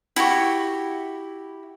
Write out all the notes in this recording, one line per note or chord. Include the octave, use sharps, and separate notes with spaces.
E4 F#4 G4 C#6